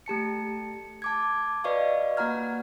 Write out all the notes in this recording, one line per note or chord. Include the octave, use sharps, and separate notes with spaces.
A3 G4 A5 C#7
A5 D6 G#6
F#4 B4 D5 D#5 F5 C#6
A#3 F#4 F#5 A#5 F6 G#6